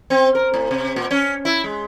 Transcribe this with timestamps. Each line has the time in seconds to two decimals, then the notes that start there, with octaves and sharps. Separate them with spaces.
0.10 C4
0.35 A#4
0.54 A2
0.71 C3
0.96 A#2
1.11 C#4
1.45 E4
1.64 G#3